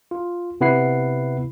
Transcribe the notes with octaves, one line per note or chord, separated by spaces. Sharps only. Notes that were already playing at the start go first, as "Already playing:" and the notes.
F4
C3 B3 E4 F#5 C7